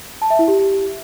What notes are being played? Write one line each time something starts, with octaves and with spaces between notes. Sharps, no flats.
A5
E5
E4
G4